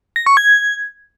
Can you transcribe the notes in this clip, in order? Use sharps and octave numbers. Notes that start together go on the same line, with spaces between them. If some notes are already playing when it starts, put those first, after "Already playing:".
A#6
C#6
G#6